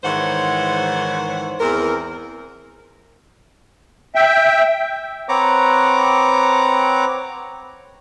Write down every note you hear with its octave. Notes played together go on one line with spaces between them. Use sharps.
G#2 D#3 E3 C5 C#5 F#5
E2 E3 C4 A#4
E5 G5
C4 B4 C#5 F#5 A#5 D6